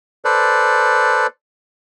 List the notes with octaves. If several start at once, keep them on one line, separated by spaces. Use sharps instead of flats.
A4 B4 C5 D5